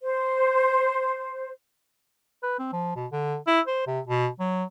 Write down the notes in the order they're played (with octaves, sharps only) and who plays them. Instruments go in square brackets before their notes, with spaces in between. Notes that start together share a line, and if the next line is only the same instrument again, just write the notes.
[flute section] C5
[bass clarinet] B4
C4
F3
B2
D3
E4
C5
C3
B2
F#3